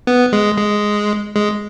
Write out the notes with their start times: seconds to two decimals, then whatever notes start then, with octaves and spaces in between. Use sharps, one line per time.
0.07 B3
0.33 G#3
0.58 G#3
1.36 G#3